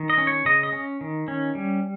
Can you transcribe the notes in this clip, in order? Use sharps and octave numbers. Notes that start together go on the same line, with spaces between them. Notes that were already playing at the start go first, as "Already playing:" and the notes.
Already playing: D#3
D#5
C#4
C#5
C#3 D#5
D#5
C#4
D#3
C#4
G3